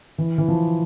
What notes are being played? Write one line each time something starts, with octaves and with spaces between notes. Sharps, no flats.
E3
E3
F3